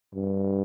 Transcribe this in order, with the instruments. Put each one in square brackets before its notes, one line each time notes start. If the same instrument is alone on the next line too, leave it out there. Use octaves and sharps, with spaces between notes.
[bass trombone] G2